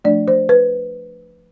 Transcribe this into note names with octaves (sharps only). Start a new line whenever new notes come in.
F3 A3 D4 D5
C5
B4